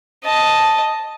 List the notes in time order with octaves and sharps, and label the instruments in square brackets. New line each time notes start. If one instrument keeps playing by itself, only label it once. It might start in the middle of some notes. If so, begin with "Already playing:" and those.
[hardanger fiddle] D#5 A5